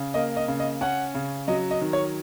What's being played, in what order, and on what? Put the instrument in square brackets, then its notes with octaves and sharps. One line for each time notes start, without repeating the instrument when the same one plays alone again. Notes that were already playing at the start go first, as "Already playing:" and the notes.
Already playing: [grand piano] C#3
A#3 D#5
D#5
C#3
D#5
C#4 F#5
C#3
F#3 D#5
D#5
D#3
C#5